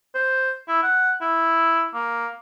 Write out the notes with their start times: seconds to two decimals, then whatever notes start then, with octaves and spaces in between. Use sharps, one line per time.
0.15 C5
0.68 E4
0.83 F#5
1.21 E4
1.94 A#3